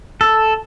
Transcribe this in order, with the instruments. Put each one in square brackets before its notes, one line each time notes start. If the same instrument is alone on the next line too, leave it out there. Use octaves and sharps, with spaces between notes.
[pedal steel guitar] A4